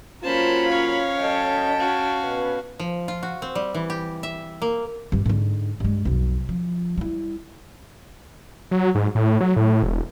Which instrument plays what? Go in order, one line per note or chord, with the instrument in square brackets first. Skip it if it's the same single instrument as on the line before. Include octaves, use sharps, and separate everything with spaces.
[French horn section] F#3 A#3 F4 [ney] C#4 [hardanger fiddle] A#4 B5 [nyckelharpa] C5 A5
[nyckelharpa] C#5 F5
[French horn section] F#3 A4 D#5 [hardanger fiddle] G5 A5
[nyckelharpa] F#4 F5
[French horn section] B2 B4
[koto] F3
F4
F#4
C4
G3
E3
G4
E5
A#3
[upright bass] G2 G3
G#2 D3
G2 G#3
B1 F2
F3
G3 E4
[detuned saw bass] F#3
G#2
A2
F#3
A2
E1